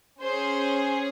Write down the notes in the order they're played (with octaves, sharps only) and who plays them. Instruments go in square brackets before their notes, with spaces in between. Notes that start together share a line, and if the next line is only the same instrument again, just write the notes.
[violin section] C#4 G#4 C5